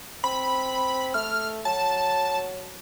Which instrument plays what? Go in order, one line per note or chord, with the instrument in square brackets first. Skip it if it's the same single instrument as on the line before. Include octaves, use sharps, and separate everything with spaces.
[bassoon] C4 [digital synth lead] B5
[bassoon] A3 [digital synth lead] F6
[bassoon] F#3 [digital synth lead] A5